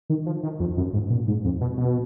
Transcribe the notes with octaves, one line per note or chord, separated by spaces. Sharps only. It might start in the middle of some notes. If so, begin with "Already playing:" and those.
D#3
F3
D#3
F2
F#2
G#2
A#2
G#2
F2
B2
B2